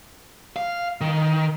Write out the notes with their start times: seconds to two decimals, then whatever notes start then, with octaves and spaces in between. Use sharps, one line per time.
0.56 F5
1.01 D#3